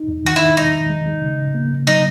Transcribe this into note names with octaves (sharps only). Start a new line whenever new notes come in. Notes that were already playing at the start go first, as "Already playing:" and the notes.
Already playing: D#4
E2
D#3 F#4
D#4 E4
G#3 D#4
D#3
G#3
G#3
C#3
C#3
A#3
C#3
F#3 D#4